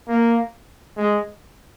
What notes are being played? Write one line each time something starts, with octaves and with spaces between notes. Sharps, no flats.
A#3
G#3